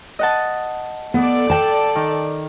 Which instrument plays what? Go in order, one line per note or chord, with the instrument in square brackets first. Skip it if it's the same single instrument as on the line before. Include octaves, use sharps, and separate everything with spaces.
[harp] D#5 F#5 A5
[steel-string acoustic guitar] B3 [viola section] A4 D5
[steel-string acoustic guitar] G5 A5
[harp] D#3